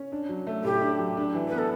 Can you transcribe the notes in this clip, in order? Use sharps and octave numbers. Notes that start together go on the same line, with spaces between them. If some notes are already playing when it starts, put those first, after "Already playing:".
Already playing: C#4
D4
F#3
A3
A2 G4
D4
F#3
D4
E3
B3 B4
A4